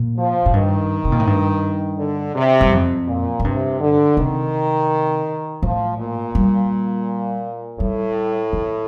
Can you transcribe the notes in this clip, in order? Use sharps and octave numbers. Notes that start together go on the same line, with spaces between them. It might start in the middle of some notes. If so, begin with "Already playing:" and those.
Already playing: A#2
F3
A2
G2 D#3
C3
A#2
A2
G2
D3
C3
G2
F2
A#2
A2
G2 C3
D3
C3 D#3
A2 F3
A#2
G3
A2 G3
D#3